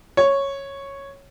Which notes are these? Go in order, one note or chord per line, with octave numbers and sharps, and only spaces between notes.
C#5